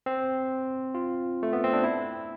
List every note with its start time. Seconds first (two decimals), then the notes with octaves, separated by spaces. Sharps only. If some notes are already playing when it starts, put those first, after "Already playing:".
0.06 C4
0.95 F4
1.43 A3
1.53 B3
1.64 C4
1.73 D4
1.84 E4